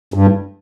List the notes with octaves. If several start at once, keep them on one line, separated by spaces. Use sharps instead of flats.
G2